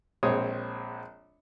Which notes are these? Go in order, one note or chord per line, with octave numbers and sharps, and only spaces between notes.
A#1 G#3 C4 C#5 D#6